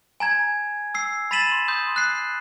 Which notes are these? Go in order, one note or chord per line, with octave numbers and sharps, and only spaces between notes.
G#5 A#5 G#6
E6 C7
B5 A6 B6 D#7 E7 F#7
C6
C6 D#6 G6
F#6 C7